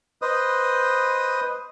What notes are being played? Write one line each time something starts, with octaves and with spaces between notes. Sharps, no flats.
B4 C5 D#5 D#6